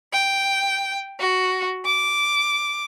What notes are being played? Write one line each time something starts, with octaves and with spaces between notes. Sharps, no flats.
G5
F#4
D6